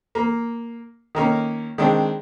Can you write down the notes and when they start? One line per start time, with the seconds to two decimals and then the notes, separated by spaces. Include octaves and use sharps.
0.15 A#3
1.15 D#3 A#3 C#4
1.78 D#3 G#3 C4 D4